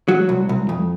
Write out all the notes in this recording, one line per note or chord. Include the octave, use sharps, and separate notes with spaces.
F#3
C2
C2
F2